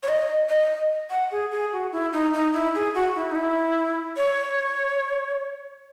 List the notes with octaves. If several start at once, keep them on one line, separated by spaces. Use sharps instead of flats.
C#5
D#5
D#5
F#5
G#4
G#4
F#4
E4
D#4
D#4
E4
G#4
F#4
E4
D#4
E4
C#5